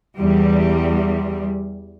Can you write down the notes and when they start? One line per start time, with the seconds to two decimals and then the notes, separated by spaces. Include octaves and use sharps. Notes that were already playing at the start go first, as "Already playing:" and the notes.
0.19 E2 G3